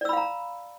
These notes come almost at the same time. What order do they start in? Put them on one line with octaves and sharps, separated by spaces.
D5 E6 B5 F5 A#5